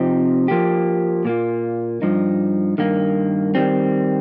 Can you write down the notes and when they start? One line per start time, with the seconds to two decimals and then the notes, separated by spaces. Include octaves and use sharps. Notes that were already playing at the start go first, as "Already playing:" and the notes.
Already playing: C3 F3 C4 D#4 G4
0.48 F3 A#3 G4
1.25 A#2 A#3 F4
2.02 G2 F3 D#4
2.78 G2 D#3 A#3
3.55 D#3 G3 C4